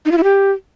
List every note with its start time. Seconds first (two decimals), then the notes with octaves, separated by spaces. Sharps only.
0.05 D#4
0.11 F4
0.18 E4
0.24 G4